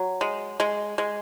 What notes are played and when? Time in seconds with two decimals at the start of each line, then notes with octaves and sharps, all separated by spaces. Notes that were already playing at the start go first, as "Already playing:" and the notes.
Already playing: F#3
0.21 G#3
0.60 G#3
0.98 G#3